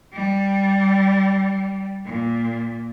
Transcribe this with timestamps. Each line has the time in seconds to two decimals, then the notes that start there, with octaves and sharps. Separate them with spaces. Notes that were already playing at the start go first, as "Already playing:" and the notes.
0.13 G3
2.05 A#2